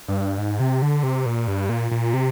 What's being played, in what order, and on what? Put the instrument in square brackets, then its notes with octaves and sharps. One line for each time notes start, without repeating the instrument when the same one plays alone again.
[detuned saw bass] G2
G#2
C3
D3
C3
A#2
G2
A#2
A#2
C3